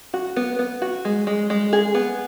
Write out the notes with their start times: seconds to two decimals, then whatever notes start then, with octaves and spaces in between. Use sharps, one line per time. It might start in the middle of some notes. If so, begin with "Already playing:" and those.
0.14 F#4
0.36 B3
0.59 B3
0.82 F#4
1.05 G#3
1.27 G#3
1.50 G#3
1.73 G#4
1.95 B3